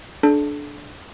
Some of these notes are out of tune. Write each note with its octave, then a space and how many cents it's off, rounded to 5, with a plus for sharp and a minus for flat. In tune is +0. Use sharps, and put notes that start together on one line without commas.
D4 +0 A4 -35